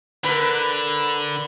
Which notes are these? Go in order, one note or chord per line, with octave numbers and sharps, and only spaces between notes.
D3 A#4 B4